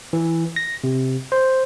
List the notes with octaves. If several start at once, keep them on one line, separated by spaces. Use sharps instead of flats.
E3
A#6
C3
C5